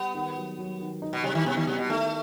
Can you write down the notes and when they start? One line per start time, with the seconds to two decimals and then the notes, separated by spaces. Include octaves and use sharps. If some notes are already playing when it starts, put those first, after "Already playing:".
Already playing: G3 B3
0.14 D#3
0.37 F#3
0.59 F#3
0.80 D#3
1.02 D#4
1.13 B2
1.23 C3 G3
1.35 D#3
1.45 C3 B3
1.57 D#3
1.67 C3 G3
1.79 B2
1.89 D#3 A3